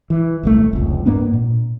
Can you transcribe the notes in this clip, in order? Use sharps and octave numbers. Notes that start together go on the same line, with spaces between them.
E3
D#1 C2 A3
F1 C#2
G#2 A#3 B3 D4
A#2